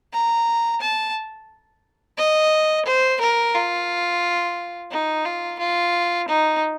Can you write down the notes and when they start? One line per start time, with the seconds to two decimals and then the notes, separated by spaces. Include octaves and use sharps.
0.13 A#5
0.81 A5
2.18 D#5
2.86 C5
3.21 A#4
3.55 F4
4.91 D#4
5.25 F4
5.59 F4
6.28 D#4